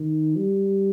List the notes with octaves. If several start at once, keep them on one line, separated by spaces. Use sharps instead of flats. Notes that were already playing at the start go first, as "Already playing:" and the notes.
Already playing: D#3
G3